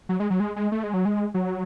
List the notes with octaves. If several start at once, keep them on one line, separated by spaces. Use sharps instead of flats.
F#3
G#3
F#3
G#3
G#3
A3
G#3
F#3
G#3
F#3